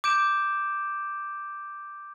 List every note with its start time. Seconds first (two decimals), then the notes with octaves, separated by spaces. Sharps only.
0.04 D6 G6 D7 E7